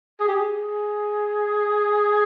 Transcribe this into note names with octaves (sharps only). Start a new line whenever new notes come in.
G#4
G4
G#4